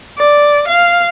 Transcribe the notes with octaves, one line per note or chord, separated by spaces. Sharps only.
D5
F5